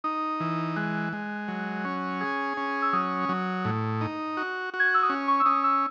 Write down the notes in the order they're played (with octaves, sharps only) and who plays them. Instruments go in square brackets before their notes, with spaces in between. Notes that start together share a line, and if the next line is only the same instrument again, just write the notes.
[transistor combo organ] D#4 [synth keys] D#6
[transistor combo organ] E3
[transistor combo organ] G#3 [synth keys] F#6
[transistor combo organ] G#3
F#3
C#4
G#4
C#4
[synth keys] E6
[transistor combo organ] F#3 [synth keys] D#6
[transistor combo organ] F#3
A2
D#4
F#4
F#4
[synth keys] G#6
F#6
E6
D#6
[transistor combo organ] C#4 [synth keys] C#6
[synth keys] C#6
E6
[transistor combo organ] C#4 [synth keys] D#6
[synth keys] E6